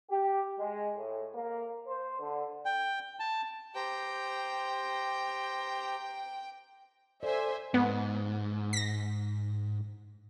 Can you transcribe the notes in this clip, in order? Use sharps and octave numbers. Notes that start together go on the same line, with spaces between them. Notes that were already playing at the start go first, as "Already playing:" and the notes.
G4
G#3
A2
A#3
C5
D3
G5
A5
G4 C5 G5 A#5
A4 C5 D5 E5 G#5
G#2 B3
A#6 B6